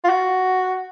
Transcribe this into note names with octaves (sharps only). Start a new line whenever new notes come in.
F4
F#4